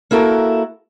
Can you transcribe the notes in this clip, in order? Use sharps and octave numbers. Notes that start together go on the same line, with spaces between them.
A#3 E4 F#4 A4 A#4